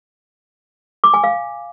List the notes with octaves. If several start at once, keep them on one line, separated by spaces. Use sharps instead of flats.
D6
G#5
F5